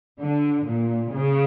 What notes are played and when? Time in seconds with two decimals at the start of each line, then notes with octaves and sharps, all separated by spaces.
0.20 D3
0.66 A#2
1.13 C#3